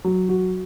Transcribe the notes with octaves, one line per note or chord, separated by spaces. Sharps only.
F#3
F#4